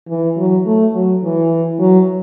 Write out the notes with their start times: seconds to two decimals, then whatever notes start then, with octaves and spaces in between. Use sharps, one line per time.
0.08 E3
0.37 F#3
0.65 A3
0.94 F#3
1.23 E3
1.79 F#3